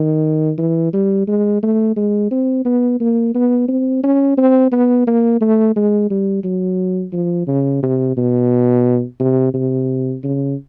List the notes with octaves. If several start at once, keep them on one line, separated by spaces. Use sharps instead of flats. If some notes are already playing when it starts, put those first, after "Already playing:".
Already playing: D#3
E3
G3
G#3
A3
G#3
C4
B3
A#3
B3
C4
C#4
C4
B3
A#3
A3
G#3
G3
F#3
F3
C#3
C3
B2
C3
C3
C#3